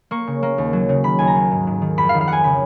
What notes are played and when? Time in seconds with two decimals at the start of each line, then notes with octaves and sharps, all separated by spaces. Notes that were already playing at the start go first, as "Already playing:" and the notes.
0.11 A#3 C#6
0.27 C#3
0.43 A#3
0.58 D#2
0.73 F#3
0.89 C#3
1.04 D#3 B5
1.19 D#2 G#5
1.27 A#5
1.36 D#3
1.51 G#2
1.67 G#2
1.82 D#3
1.98 F2 B5
2.09 D#3 F5
2.21 F5
2.28 F2 F#5 G#5
2.44 C#3 B5